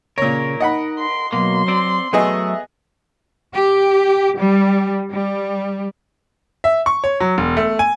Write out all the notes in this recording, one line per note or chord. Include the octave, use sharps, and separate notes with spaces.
A#2 C#3 A#4 C#5
D#4 D#5 F#5 B5
C6
B2 F#3 A#3 C6
C4 D5
F#3 A3 B3 G#4 D#5 E5
G4
G3
G3
E5
C#6
C#5
F#3
E1
A3
G#5